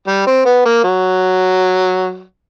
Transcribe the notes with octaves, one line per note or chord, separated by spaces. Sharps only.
G3
C4
B3
A#3
F#3